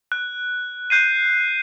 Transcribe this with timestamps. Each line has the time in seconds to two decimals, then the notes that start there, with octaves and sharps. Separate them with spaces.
0.12 F#6
0.90 F#6 G6 C7 D#7